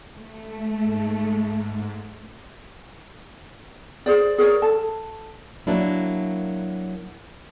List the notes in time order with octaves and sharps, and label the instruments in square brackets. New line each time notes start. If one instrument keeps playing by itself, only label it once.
[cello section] A3
[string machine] G#2
[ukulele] G#4 C5 D5
G#4 A#4 C#5 D5
A4 A5
[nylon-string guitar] F#3 A#3 D4 E4